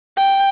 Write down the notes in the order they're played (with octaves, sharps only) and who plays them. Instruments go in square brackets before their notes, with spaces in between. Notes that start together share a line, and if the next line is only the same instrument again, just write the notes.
[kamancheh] G5